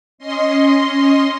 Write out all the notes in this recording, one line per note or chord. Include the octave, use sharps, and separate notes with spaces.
C#4 D#5 C6